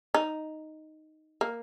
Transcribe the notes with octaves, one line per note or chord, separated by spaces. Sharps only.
D#4
A#3